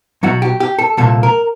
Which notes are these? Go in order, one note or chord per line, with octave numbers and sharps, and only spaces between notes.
B1 B2 F#3 F#4
G4
G4
A4
C2 A#2 F3 A4
A#4